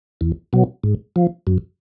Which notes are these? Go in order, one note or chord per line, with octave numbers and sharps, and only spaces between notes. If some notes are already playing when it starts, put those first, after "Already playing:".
E2
B2 F#3
G#2
F3
F#2